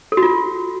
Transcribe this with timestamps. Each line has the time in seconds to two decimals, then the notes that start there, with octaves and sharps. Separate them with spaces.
0.12 A4
0.17 F#4
0.23 F4